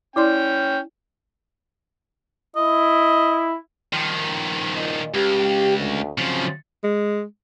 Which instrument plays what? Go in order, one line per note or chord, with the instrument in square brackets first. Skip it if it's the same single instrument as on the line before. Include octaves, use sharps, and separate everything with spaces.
[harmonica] C#4 G5 [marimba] E4 D5 C6
[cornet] E4 [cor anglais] D#5
[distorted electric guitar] D#3 F3
[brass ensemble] A#2 D#5
[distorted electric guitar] C#2 [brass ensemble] G4
[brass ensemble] D2
[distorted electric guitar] C#3 F3 [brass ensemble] F#3 C4
[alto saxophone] G#3